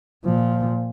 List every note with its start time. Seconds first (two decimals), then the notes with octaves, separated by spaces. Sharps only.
0.25 A#2 F3